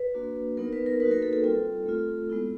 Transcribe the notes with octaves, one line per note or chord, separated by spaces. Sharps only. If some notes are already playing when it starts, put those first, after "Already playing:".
Already playing: B4
A#3 D4 F#4
F#3 B3 D#4 A#4
B4
A#4
A#3 D#4 F#4 B4
A#4
A4
A4
G3 C4 F4 A4
A3 C4 F4
G#3 B3 E4